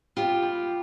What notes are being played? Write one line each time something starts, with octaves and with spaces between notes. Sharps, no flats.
B3 F4 G4
G3